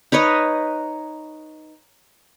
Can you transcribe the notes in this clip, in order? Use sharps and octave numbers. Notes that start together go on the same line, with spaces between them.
D#4 B4 C#5 D#5